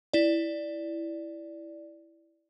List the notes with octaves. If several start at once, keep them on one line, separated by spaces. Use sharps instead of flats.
E4 D5